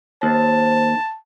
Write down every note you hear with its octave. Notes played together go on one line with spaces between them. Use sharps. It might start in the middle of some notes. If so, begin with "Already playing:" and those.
D#2 C5 A5